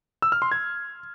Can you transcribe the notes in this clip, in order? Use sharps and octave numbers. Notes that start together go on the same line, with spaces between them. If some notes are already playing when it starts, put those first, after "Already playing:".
E6
F6
C6
G#6